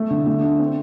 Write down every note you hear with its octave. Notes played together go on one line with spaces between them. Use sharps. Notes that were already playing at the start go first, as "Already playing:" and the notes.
Already playing: A3
D3
A3
D4
C4